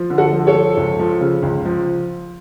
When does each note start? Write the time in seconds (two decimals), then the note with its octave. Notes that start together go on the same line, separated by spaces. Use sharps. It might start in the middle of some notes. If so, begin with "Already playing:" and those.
Already playing: F3
0.10 D3
0.18 F#4 A4
0.32 F3
0.47 A4 C#5
0.54 F3
0.77 C#2
0.99 F3
1.21 C#3
1.43 C#2
1.65 F3